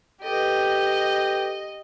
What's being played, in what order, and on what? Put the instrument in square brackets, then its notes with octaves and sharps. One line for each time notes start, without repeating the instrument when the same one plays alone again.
[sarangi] G4 [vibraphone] A4 B4 [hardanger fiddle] D#5